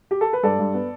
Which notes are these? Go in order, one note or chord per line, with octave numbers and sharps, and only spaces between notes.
G4
A4
B4
G2 A4 D5
G2
B3